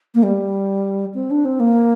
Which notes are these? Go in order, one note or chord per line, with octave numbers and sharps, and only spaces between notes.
A#3
G3
C4
D4
C4
A#3